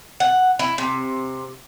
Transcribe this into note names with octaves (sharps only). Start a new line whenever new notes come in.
F#5
E4
C3